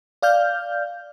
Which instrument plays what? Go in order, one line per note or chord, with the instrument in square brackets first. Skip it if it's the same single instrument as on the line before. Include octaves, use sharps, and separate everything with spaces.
[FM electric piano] D5 F5 F6 G6